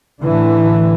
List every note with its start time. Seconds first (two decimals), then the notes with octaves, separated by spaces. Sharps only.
0.22 A2 D3 E3